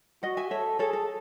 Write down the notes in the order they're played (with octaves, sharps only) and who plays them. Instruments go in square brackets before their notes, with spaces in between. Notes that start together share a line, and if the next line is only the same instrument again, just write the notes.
[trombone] F#4 [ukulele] D#5 F#5
[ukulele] E5 G#5
[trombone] A4 [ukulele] C#5 E5
[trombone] G#4 [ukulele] A4 C#5
[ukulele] A4